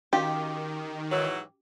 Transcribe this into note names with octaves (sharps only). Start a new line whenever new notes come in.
D#3 C#4 F#4 G4 F5
G#2 E3 F#3